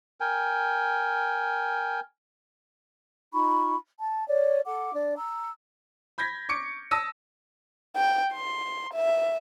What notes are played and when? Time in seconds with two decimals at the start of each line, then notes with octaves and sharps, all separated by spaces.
0.20 A#4 G5 G#5
3.33 D#4 F4 B5 C#6
4.00 A5
4.28 C#5 D5
4.66 A4 F#5 D6
4.95 D4 D5
5.17 A#5 E6
6.18 B5 G6 G#6 A#6 B6
6.49 C#6 D6 C#7 D7
6.91 A5 D#6 E6 A#6 D#7
7.96 G5
8.33 C6
8.93 E5